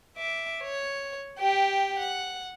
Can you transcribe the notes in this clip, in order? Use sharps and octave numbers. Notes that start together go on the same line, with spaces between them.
E5 D6
C#5
G4 G5
F#5